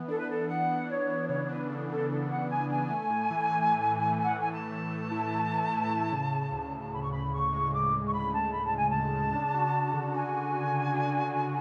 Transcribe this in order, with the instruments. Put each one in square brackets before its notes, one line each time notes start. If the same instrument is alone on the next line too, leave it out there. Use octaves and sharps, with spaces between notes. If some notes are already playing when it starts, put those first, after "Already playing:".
Already playing: [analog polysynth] E3 B3
[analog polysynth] D4 [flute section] A4
[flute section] B4
[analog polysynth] B3 [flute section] A4
[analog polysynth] E3 [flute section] F#5
[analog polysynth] B3
[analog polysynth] D4 [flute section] C#5
[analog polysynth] B3
[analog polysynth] C#3 [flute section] C#5
[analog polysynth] D4 [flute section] B4
[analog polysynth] C#3 [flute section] A4
[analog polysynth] E3 [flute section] A4
[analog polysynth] E3 [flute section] A4
[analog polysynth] C#3 [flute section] F#5
[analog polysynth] B3 [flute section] G#5
[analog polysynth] D4 [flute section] G#5
[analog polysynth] A3
A2
E3
E3
E3
E3
A3
[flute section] F#5
[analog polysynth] A2
[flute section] G#5
[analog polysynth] E3 [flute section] A5
[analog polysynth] A3
A3
E4
E4
E3
E4
A2
C#3
C#3
D2
D2
[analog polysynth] D2 [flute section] B5
[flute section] C#6
[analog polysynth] C#3 [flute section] B5
[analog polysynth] D2 [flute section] C#6
[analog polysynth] G#3
[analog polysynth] D2 [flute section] D6
[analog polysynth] C#3
[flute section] C#6
[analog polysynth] D2 [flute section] B5
[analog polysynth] C#3 [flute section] A5
[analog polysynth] D2 [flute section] B5
[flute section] A5
[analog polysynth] C#3 [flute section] G#5
[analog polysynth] D2 [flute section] A5
[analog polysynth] C#3
D4
F#4
F#4
D3
[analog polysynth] F#4 [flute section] G#5
[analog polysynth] F#4
F#4
D3
D4
D4
D3